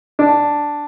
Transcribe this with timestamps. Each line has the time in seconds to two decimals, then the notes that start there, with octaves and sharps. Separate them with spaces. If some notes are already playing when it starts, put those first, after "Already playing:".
0.19 D4